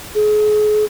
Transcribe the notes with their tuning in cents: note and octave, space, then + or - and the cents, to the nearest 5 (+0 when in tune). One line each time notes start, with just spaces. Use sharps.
G#4 +35